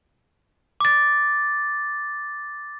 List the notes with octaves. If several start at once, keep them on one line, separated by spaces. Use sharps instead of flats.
D6 A6